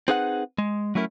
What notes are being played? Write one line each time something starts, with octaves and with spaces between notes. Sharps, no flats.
C4 D#4 G#4 B4 E5 F#5
G#3
F#3 A3 C#4 E4 A#4